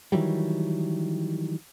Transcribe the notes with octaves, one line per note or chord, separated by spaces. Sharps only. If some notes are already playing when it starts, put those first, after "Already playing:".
D#3 E3 F#3 G3